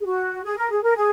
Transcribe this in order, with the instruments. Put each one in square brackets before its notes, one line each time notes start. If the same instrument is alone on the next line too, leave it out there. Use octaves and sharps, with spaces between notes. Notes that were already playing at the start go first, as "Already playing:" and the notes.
[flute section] G#4
F#4
G#4
A#4
G#4
A#4
G#4